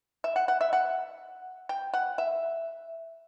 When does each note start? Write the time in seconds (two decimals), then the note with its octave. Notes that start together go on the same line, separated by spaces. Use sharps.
0.24 E5
0.36 F#5
0.48 F#5
0.61 E5
0.73 F#5
1.69 G5
1.94 F#5
2.18 E5